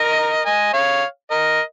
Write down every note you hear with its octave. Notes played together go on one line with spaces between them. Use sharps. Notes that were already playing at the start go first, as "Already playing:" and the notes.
Already playing: A#4 D#5
D#5 G#5
C#5 F5
A#4 D#5